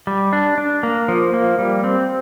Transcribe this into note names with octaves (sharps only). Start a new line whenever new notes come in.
G3
D4
D4
A#3
F3
A#3
G3
C4